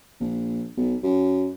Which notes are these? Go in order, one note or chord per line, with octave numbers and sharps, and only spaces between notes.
A#1
B1
F#2